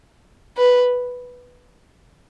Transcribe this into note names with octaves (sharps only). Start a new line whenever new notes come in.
B4